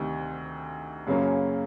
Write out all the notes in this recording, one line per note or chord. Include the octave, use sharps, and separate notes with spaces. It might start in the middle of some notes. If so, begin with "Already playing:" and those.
Already playing: D2 C3 D#3
F#2 C#3 F#3 A#3 C#4